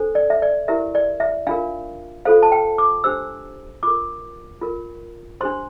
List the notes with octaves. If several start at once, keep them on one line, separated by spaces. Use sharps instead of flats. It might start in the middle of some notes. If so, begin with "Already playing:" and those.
Already playing: D4 A4 C5
D5
E5
D5
E4 G4 A#4 E5
D5
E5
D4 F4 A#4 F5
F4 A4 C5 F5
A5
G5
D6
D4 G4 C5 E6
F4 A#4 D6
F4 A#4
D4 G4 C5 C6